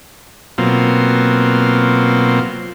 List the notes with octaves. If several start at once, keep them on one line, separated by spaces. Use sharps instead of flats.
B2 F#3 A#3 C4 F4